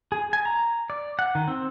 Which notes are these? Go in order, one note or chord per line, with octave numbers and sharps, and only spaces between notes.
G#4
G#5
A#5
D5
F#5
D#3
C4